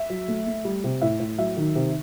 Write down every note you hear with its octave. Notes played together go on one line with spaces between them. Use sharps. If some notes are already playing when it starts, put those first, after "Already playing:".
Already playing: E5
F#3
A3
A3
G3
C3
A2 E5
A2
F#3 E5
D#3
C3